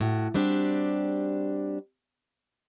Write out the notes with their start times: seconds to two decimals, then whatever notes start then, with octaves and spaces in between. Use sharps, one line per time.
0.01 A2 F#4
0.34 G3 C4 D4 F#4 G4